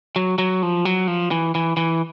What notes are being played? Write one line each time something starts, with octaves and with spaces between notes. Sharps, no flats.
F#3
F#3
F3
F#3
F3
E3
E3
E3